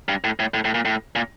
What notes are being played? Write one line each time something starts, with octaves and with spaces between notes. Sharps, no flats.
G2
A2
A2
A2
A2
A#2
A2
A#2